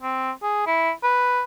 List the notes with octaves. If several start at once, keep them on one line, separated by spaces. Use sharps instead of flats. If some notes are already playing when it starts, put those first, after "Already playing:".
C4
G#4
E4
B4